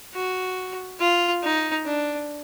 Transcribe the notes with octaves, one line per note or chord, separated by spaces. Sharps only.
F#4
F4
D#4
D4